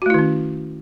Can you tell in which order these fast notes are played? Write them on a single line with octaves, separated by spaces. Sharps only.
F#4 A3 E4 D#3 C#4